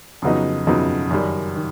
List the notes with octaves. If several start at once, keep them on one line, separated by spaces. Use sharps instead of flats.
F2 C#3 F#3 B3 D#4
F2 C#3 F#3 B3 D#4
F#2 D#3 G3
D#3